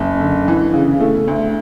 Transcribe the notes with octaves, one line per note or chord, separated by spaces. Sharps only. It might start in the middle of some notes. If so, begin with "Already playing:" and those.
Already playing: F#1
D3
E3
C#3
A3
D2